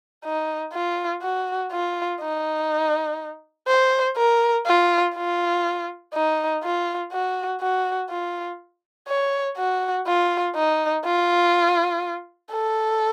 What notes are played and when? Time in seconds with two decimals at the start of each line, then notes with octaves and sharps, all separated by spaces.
0.24 D#4
0.74 F4
1.22 F#4
1.72 F4
2.21 D#4
3.68 C5
4.17 A#4
4.66 F4
5.15 F4
6.14 D#4
6.63 F4
7.12 F#4
7.61 F#4
8.10 F4
9.08 C#5
9.58 F#4
10.07 F4
10.56 D#4
11.05 F4
12.52 A4